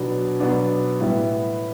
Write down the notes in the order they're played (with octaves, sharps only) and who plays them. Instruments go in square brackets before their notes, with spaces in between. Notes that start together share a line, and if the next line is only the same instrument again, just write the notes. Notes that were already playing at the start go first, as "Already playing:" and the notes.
Already playing: [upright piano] B2 F#3 B3 D4
B2 F#3 B3 D4
A2 G3 B3 E4